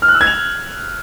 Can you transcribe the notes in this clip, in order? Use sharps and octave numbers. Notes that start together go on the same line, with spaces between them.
F6
F#6
E6
G#6
F7